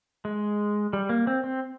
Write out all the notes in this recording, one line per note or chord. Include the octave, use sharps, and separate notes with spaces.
G#3
G3
A#3
C4
C4